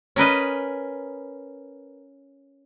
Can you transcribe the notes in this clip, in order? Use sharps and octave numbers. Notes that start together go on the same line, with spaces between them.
C#4 A#4 B4 D#5